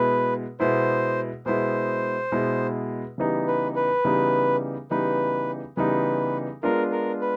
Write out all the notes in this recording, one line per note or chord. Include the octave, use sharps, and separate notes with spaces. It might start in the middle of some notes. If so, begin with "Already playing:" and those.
Already playing: B2 G#3 B3 E4 B4
B2 G#3 B3 E4 C5
B2 G#3 B3 E4 C5
B2 G#3 B3 E4
C#3 E3 G3 B3 D#4
B4
B4
C#3 E3 G3 B3 D#4
C#3 E3 G3 B3 D#4 B4
C#3 E3 G3 B3 D#4 B4
G#3 B3 D4 F4 A#4
A#4
B4